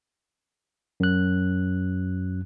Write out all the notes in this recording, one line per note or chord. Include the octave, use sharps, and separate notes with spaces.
F#2 F#6